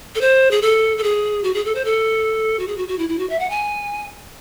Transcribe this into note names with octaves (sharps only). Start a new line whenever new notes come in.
A4
C5
G#4
A4
A4
G#4
F#4
G#4
A4
C5
A4
F#4
G#4
F#4
F#4
E4
E4
F#4
E5
F#5
G#5